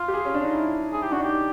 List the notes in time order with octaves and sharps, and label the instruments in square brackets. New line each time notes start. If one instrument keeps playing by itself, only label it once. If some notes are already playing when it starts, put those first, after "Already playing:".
Already playing: [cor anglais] F4
[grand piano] G4
G#4
C#4
D4
D#4
E4
[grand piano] E4 [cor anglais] G#4
[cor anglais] G4
[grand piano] D4 [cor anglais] F#4
[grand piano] D#4 [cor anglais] G4